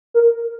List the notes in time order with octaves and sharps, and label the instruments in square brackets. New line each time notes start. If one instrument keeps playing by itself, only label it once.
[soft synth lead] A#4